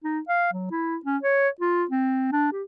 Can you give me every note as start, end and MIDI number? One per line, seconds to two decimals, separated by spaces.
0.04 0.20 63
0.28 0.52 77
0.53 0.68 54
0.71 0.97 64
1.05 1.17 61
1.23 1.48 73
1.60 1.84 65
1.90 2.31 60
2.32 2.51 62
2.52 2.63 67